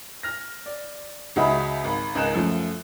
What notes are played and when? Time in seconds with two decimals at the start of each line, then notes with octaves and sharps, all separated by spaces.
0.23 F6 A#6
0.66 D5
1.36 C#2 C#3 F#4 D#5 E5 B5
1.84 G#1 B5
2.15 G#1 C#2 D#4 A#4 F#6 E7
2.34 F#2 F3 A3